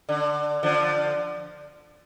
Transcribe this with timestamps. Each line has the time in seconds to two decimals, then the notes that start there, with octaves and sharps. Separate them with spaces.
0.09 D3
0.63 D3 F3